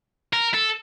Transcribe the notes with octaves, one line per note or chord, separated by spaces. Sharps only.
A#4
A4